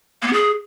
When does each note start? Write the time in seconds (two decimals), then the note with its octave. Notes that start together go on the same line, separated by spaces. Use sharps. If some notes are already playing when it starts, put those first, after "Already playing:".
0.22 A#3
0.27 B3
0.33 G#4